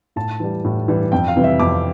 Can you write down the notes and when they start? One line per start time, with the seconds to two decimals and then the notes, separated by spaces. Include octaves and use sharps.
0.16 A2 A5
0.40 E3 G3
0.65 A2
0.88 E3 G3
1.12 F2 G5
1.28 F5
1.36 C3 E3 G3
1.44 E5
1.60 F2 D6